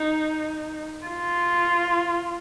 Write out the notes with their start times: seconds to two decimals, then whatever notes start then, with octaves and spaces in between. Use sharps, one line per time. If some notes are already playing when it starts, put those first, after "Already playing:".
Already playing: D#4
1.07 F4